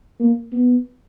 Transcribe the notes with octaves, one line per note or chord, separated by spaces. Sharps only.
A#3
B3